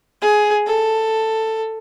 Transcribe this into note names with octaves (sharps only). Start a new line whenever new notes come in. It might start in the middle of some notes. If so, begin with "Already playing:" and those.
G#4
A4